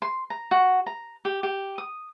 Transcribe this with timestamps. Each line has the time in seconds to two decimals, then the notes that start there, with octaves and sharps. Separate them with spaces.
0.02 C6
0.30 A#5
0.51 F#4
0.86 A#5
1.25 G4
1.43 G4
1.78 D#6